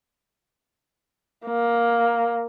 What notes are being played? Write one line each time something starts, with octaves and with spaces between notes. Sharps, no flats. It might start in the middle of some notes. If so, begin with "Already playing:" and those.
A#3